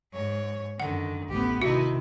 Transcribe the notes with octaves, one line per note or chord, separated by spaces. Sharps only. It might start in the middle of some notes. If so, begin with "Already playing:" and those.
G#2 C#5
F#2 D3 D#3 F#5
A1 D2 B3 G4
C3 D#3 D#4 E4 F#4